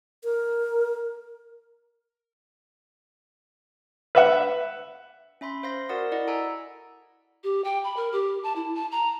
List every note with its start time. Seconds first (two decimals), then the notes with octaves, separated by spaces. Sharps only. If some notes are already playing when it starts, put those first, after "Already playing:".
0.24 A#4
4.15 B4 E5 F#5
5.41 C#4 E5 B5 C6
5.63 C5 F5 C6 A#6
5.89 F#4 A#4 D5 F#5 D#6
6.12 E4 D5 D#5 F#5
6.27 A4 G#5 A#5 E6
7.44 G4
7.64 G5
7.84 B5
7.97 A#4
8.12 G4
8.43 A5
8.56 E4
8.75 A5
8.91 A#5